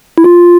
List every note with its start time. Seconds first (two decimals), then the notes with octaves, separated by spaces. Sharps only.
0.18 E4
0.24 F4